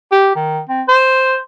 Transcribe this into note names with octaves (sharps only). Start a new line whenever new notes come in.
G4
D#3
C4
C5